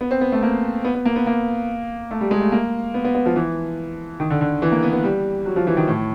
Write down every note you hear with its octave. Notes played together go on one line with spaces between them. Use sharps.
B3
C4
B3
A3
A#3
B3
B3
A#3
B3
A#3
A3
G3
G#3
A3
A#3
B3
B3
B3
F3
E3
D#3
D3
D3
E3
A#3
B3
B3
G3
F#3
F3
E3
D#3
A2